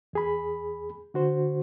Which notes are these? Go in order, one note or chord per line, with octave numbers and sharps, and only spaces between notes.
E2 G#4 B5
D3 F#4 C5